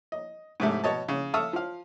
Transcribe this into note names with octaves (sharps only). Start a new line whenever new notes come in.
D#5
G#2 C3 A3
B2 C#5 D#5 A5
C#3
A4 E5 F5 C#6 D#6 E6
F3 F5